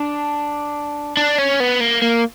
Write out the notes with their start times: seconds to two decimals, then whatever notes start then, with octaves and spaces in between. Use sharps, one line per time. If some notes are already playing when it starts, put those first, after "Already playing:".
Already playing: D4
1.17 D4
1.38 C#4
1.60 B3
1.81 A#3
2.02 A#3